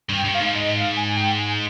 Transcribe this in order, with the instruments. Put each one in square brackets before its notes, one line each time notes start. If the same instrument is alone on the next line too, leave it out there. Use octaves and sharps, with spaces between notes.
[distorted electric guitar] G2
[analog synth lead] G5
[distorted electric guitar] G2
[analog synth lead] F5
[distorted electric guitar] G#2
[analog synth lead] D#5
F5
G#5
G#5
G5
G#5